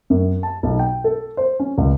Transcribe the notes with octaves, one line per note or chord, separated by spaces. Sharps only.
F#2
A5
B1
G5
A4
C5
C#4
C#2